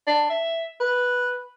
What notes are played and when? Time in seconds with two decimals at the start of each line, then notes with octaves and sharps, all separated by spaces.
0.07 D4
0.30 E5
0.80 B4